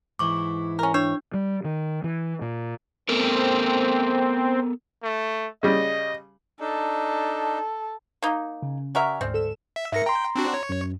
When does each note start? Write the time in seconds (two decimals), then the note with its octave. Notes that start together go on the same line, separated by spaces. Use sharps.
0.19 G#2 E3 E4 C#6 D6
0.79 C#4 A#4
0.94 D4 C#5
1.34 G3
1.65 D#3
2.04 E3
2.41 A#2
3.09 B3 C4 A4 A#4
5.03 A3
5.63 C#3 G3 D#5
6.60 D4 D#4 A4
8.22 A#3 D#4
8.62 C#3
8.95 F#4 A#4 D5 E5 G#5 F6
9.21 D2 G#2 C4
9.34 A4 E5 E7
9.76 E5
9.92 G#2 A#4 E5 A#6 C#7
10.06 G5 A#5 C6
10.35 C4 D4 F#4
10.54 C#5
10.69 F#2